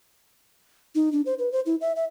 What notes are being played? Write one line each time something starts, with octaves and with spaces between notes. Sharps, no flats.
D#4
D4
C5
B4
C5
E4
E5
E5